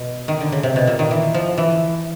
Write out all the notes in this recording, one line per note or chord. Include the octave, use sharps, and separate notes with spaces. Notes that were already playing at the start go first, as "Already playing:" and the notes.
Already playing: B2
D#3
D3
C#3
C3
B2
A#2
D#3
E3
F3
E3